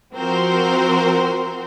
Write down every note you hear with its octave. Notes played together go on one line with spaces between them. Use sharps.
F3 C4 F#4 A#4 C5